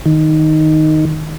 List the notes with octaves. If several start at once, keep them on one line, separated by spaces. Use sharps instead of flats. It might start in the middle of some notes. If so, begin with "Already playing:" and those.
D#3